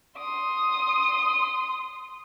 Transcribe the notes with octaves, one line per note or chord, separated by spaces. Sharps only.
C6 D#6